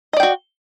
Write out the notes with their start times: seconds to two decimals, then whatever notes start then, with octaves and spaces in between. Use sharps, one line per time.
0.13 D#5
0.17 D5
0.20 G5
0.23 F#4